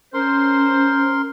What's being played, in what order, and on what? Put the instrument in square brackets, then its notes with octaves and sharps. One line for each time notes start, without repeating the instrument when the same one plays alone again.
[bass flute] C#4 [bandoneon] A#4 C6 [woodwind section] C5